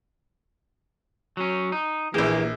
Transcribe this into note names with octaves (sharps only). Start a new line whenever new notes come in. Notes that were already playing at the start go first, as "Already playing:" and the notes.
F#3 C#4
D#4
A#1 E3 A#3 G4 G#4